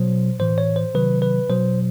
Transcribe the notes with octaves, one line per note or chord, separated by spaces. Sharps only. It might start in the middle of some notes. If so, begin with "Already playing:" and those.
Already playing: B2 F#3 C5
A2 E3 C5
C#5
C5
C3 D#3 F#3 B4
B4
B2 F#3 C5